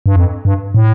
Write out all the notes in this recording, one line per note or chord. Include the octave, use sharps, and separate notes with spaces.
G2
F2
G2
A2